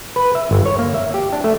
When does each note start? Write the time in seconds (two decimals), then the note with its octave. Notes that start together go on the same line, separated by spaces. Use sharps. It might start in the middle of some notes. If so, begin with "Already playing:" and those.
0.16 B4
0.35 E5
0.51 G1
0.66 C#5
0.79 A#3
0.94 E5
1.14 G4
1.33 D4
1.44 A3